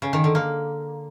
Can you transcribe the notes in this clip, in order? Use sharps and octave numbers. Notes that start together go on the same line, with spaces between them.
C#3
D#3
D3
A#3